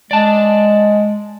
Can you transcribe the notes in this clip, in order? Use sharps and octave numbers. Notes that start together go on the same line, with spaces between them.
G#3 D5 A5